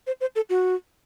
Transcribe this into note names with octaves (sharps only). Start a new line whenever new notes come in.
C5
C5
A4
F#4